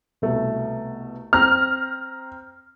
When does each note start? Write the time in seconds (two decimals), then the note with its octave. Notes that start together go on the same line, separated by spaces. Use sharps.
0.22 C2 B2 A3
1.33 C4 A#5 F6